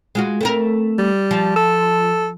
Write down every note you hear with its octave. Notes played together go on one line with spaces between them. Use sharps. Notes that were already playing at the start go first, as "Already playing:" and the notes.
G#3 F4 F#4
A3 C4 A#4
G3
F3
A4